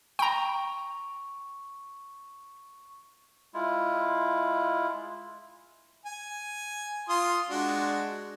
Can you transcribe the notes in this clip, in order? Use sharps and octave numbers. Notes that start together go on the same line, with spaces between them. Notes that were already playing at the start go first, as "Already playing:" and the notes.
G5 A#5 C#6
G#3 E4 F4
G#5
F4 C6 D#6
G#3 D4 F#4